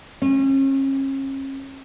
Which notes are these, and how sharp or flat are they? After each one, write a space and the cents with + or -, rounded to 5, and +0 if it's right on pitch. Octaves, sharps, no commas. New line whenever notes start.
C#4 -40